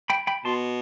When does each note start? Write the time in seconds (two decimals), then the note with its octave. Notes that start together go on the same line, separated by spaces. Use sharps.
0.10 G5 B5
0.27 G5 B5
0.45 B2 A5 C6